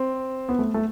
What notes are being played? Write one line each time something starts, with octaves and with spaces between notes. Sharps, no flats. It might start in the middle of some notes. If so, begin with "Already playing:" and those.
Already playing: C4
B3
A3
A3